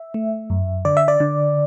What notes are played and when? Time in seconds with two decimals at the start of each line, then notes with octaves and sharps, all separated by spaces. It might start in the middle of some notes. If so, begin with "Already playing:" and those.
Already playing: E5
0.14 A3
0.50 F#2
0.85 D3 D5
0.97 E5
1.08 D5
1.20 D3